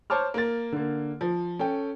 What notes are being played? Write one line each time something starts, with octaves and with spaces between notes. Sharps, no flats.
C5 C#5 A5 D6 F6
A#3 A6
D3 A#3
F3
C#4 A4 G5